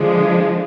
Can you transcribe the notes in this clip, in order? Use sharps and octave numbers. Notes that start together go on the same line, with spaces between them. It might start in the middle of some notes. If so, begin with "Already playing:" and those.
Already playing: D3 F3 G#3